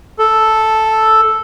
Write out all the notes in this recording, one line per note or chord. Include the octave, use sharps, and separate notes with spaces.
A4